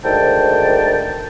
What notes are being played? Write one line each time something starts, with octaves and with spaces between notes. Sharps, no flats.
D2 G#2 D#3 G5 A5